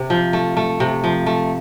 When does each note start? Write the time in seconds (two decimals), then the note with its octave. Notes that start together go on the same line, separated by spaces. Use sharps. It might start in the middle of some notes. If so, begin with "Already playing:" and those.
Already playing: C3
0.10 F3
0.33 A3
0.57 A3
0.80 C3
1.04 F3
1.26 A3